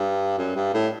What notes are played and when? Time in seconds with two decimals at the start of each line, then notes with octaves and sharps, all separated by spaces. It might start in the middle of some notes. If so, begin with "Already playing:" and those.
Already playing: G2
0.38 F#2
0.56 G2
0.74 A2